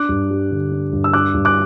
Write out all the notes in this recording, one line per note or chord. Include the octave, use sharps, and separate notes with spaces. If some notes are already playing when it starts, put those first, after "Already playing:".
Already playing: D4 D6 F#6
G2
G3
D3
D4
G2
E6
D4 D6 F#6
G2
D6 F#6